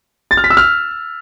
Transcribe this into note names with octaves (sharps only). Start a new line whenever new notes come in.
A6
F6
B6
E6
F6